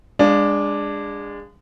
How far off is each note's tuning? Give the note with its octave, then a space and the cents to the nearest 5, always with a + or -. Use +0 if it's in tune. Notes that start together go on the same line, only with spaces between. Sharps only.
G#3 -25 D4 +0 F5 +0